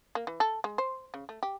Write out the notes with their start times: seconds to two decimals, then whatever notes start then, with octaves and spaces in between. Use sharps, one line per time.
0.15 A#3
0.27 E3
0.40 A4
0.64 G#3
0.78 C5
1.14 C#3
1.29 A3
1.43 G4